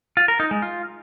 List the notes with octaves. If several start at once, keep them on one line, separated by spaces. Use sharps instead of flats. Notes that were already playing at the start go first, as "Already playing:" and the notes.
F4
A#4
D#4
G#3
F4